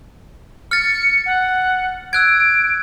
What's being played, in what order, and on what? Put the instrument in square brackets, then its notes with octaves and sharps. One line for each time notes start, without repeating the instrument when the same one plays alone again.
[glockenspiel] F6 A6 [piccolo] C#7
[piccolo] F#5
[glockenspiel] E6 F#6 G#6 [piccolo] D7